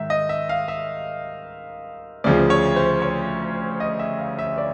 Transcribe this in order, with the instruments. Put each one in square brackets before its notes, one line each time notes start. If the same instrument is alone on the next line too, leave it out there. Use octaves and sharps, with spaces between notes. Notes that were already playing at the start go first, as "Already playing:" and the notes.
Already playing: [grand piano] G#2 D#3 E5
D#5
E5
F5
E5
D2 C#3 F3 D5
C#5
C5
C#5
D#5
E5
F5
E5
D5